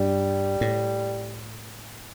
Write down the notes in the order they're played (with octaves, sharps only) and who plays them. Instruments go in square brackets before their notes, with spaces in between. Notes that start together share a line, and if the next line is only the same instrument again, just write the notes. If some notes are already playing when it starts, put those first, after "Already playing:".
Already playing: [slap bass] G2 [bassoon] G3
[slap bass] A2